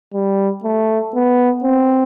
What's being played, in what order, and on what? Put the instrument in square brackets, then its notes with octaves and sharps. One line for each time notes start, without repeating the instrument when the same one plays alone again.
[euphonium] G3
A3
B3
C4